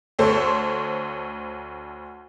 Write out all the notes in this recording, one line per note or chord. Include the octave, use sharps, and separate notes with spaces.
D2 A3 A4 C5 C#5 C6